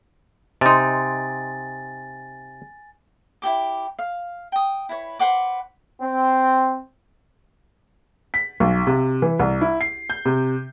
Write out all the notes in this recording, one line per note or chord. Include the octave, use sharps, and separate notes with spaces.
C3 D#4 D#5 G#5 C6 A6
E4 F#4 G4 D6
F5
G5 D#6
E4 B4 C#5
B4 C5 F#5 D6
C4
B6
B1
C3
E3
C2
E4
C7
G6
C3